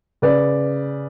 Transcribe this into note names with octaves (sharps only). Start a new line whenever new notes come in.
C#3 B4 D5